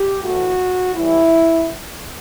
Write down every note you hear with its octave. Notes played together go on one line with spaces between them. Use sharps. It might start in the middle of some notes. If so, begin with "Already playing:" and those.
Already playing: G4
A2 E3 A3 F#4
A2 E3 G3 E4